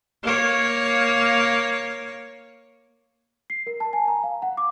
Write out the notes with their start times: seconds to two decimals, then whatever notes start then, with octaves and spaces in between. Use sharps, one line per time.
0.23 A#3 C#5
3.50 C7
3.67 A#4
3.80 A5
3.93 G#5
4.08 A#5
4.23 F5
4.42 F#5
4.57 D6